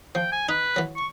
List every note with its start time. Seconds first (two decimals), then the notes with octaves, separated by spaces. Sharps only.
0.15 F3 G5
0.32 G#5
0.49 D#4 B4
0.76 E3 F#3
0.96 C#6